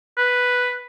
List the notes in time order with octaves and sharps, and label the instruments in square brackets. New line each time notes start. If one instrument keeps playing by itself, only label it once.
[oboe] B4